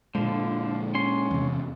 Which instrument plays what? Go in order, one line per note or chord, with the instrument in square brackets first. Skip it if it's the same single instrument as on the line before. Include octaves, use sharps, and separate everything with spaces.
[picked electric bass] A#2 G#3 [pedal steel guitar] D3 F3
[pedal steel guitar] C#4 C6
[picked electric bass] E2 C3